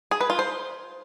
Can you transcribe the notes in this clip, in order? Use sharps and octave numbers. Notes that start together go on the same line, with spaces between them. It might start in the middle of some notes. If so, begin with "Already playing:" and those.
G#4
B4
F4
C5